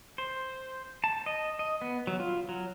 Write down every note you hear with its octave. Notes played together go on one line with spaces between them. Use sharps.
C5
A5
D#5
D#5
B3
F#3
F4
F#3